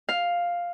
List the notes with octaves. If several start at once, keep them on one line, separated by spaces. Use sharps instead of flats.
F5